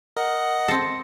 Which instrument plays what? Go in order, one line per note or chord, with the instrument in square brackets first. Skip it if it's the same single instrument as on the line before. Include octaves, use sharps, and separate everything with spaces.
[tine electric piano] A#4 [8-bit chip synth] D#5 [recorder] F#5
[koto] C4 A4 [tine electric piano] A#6 C#7